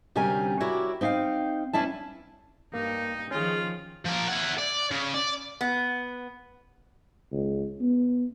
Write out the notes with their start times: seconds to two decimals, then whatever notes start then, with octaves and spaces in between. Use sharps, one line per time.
0.16 D2 C3 G3 C#4 A#4 G#5
0.60 E4 F#4 G4 A#4 C#5 D5
1.01 C4 D#4 E5 F5 G5
1.73 E2 C#4 D4 E4 A5
2.74 G2 A#3 D#4
3.31 D#3 F3 C#4 F4 G#4
4.06 F3 A#4
4.29 E4 F#5
4.59 D5
4.91 C#3
5.14 D5
5.61 B3
7.32 C#2
7.81 B3